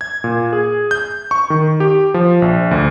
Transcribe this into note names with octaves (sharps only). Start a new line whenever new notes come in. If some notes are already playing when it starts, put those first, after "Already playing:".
G#6
A#2
G#4
G6
C#6
D#3
G4
F3
A#1
D2